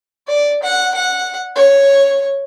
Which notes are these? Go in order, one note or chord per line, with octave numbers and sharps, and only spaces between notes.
D5
F#5
F#5
C#5